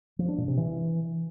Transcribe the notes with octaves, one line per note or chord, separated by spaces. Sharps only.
F3
D4
A#2
C3
E3